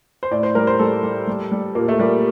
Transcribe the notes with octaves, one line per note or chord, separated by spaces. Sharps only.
C5
A2 D5
C5
G3 A#4
C5
G3 A4
G3
G3
G3
A#2 A#3
A3
G3 A#3